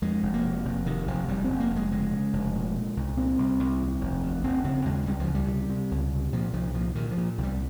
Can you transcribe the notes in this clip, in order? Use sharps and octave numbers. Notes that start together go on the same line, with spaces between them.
F2 G#3
F1
A#3
C3
F1
C3 D#3
F1 F3
F1 G3
C4
F1
A#3
F1
G#3
C#3 G#3
C#3
F1
A#2
A#2
C2
A#2 C4
C2
C2
D#2
F1
D#2
F1 C4
C#3 C4
D#2 G#3
C#2 G3
F3
C#2
G3
C3
C3
C#2
C3
A#2 F3
C2 F3
A#2 F3
A#2 D#3
F3
A#2
C2
G3